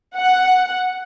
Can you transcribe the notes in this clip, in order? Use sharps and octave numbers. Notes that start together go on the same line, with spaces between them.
F#5